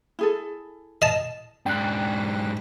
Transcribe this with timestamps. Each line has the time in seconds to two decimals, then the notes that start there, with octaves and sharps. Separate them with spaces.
0.19 E4 G#4 A4
1.02 D#5 A5
1.66 G#2 D4 G5 F#6